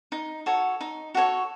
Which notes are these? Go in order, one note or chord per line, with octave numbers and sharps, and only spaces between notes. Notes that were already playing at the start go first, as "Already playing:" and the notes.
D#4
F#4 A4 C#5
D#4
F#4 A4 C#5